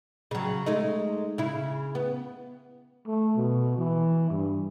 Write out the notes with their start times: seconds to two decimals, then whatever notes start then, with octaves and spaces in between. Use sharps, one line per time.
0.31 C#3 F#3
0.66 G#3 A3 D#4
1.38 C#3 E4
1.95 B3
3.07 A3
3.37 B2
3.78 E3
4.31 G2